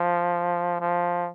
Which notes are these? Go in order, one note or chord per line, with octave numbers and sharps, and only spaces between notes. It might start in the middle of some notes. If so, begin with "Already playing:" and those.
Already playing: F3
F3